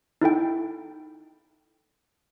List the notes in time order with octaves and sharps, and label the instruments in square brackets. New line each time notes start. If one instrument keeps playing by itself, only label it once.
[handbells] D#4 E4 A4 G5